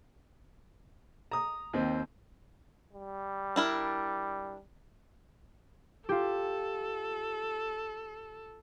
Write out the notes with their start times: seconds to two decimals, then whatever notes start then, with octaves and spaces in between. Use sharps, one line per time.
1.31 A#5 D#6
1.73 D#2 C4
2.93 G3
3.56 D4 E4 A#4
6.09 F4 G4 A4